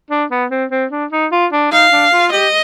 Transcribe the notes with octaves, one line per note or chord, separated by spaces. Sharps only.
D4
B3
C4
C4
D4
D#4
F4
D4
D#4 F5
D4
F4
G4 D#5